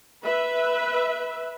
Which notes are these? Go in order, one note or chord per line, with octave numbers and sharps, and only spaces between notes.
B4 E5